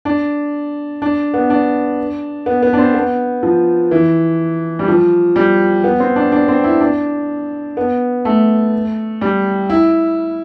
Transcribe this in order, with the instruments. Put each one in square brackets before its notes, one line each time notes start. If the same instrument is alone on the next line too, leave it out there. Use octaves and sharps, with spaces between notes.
[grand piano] D4
D4
B3
D4
B3
B3
D4
C4
B3
F3
E3
G3
F3
G3
B3
C4
D4
D4
C4
E4
D4
B3
A3
G3
E4